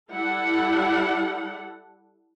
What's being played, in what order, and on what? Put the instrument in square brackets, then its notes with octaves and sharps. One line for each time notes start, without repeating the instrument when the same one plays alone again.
[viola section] G3 E4 A4 F#5